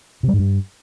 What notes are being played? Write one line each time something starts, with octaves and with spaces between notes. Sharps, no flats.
C3
G3
G#2
G2